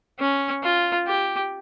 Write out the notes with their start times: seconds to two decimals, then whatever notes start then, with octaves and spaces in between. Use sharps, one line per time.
0.20 C#4
0.63 F4
1.07 G4